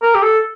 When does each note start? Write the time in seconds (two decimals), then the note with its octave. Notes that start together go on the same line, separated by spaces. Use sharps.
0.02 A#4
0.15 G4
0.23 A4